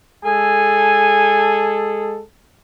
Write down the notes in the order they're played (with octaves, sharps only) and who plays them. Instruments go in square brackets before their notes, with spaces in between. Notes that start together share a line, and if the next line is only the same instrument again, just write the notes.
[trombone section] G#3 G#4 A4 [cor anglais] G#5